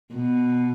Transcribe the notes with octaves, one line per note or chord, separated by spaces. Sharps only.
B2